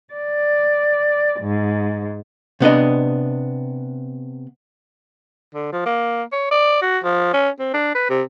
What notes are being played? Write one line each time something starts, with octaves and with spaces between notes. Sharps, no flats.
D5
G#2
C3 B3 D4 D#5
D3
F3
A#3
C#5
D5
F#4
F3
C#4
C4
D4
B4
C3